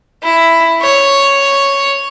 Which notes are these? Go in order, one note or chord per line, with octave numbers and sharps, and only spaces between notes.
E4
C#5